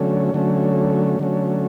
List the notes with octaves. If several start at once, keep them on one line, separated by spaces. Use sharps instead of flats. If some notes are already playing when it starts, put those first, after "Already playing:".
Already playing: D3 F#3 A3 C#4
D3 F#3 A3 C#4
D3 F#3 A3 C#4